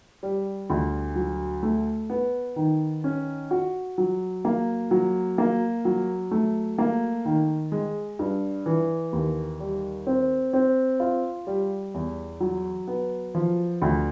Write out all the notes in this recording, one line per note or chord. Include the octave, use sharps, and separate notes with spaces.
G3
D2
F#3
A3
B3
D#3
C#4
F#4
F#3
A#3
F#3
A#3
F#3
A3
A#3
D#3
G#3
G2
E3
D#2
G3
C4
C4
F4
G3
E2
F#3
B3
F3
D2